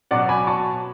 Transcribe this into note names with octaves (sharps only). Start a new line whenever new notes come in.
B2 F#3 C#4 D5 F#5
G#5 B5
A5 C#6